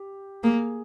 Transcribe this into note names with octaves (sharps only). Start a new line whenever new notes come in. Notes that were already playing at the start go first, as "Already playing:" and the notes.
Already playing: G4
A#3 G#4